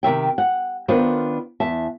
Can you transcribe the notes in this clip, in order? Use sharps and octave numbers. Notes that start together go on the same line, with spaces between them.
C3 D#3 E5 G5
F#5
D#3 B3 D4 F4 A#4 C5
E2 E5 A5